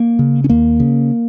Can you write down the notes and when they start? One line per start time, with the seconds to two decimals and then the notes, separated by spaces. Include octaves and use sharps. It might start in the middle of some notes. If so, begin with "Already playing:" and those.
Already playing: A#3
0.19 C#3
0.44 C#4
0.50 D#2 A#3
0.80 C#3